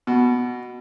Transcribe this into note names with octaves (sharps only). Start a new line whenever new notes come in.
B2